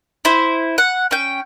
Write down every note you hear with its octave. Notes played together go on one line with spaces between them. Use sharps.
E4 C5
F#5
C#4 G5